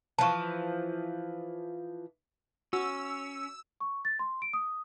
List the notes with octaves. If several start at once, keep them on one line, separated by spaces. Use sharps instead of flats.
E3 F3 A5 C#6
C#4 F#4 E6
C#6
A6
C6
D7
D#6